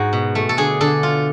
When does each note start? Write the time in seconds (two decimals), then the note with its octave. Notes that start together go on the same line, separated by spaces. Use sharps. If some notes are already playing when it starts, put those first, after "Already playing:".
Already playing: G#2 F#4
0.13 B2
0.35 A3
0.49 A4
0.57 D3 G#4
0.81 D3 A4
1.03 F4